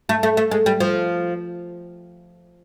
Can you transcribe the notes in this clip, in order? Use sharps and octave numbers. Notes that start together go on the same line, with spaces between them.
A3
A3
A3
G#3
G3
F3